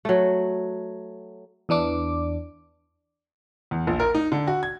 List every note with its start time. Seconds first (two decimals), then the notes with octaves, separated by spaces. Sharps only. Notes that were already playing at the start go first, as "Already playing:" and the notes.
0.05 F#3 A3
1.69 E2 E3 D4 D6
3.71 E2
3.87 A#1
4.00 A#4
4.15 D#4
4.32 D3
4.47 F#4
4.63 G#6